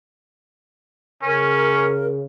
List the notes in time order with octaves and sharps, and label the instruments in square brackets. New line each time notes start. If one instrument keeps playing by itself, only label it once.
[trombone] C#3 [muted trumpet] C#4 [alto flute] A#4